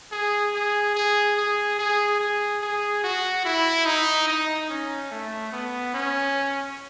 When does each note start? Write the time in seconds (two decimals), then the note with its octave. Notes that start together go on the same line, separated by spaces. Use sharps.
0.12 G#4
0.55 G#4
0.95 G#4
1.37 G#4
1.79 G#4
2.20 G#4
2.62 G#4
3.04 F#4
3.45 E4
3.86 D#4
4.28 D#4
4.70 C#4
5.12 A3
5.53 B3
5.94 C#4